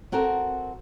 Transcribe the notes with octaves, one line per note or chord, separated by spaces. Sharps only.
C4 F#4 A4 A#4